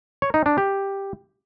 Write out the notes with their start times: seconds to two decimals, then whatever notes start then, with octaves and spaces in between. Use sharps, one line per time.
0.22 C#5
0.34 D#4
0.46 D4
0.58 G4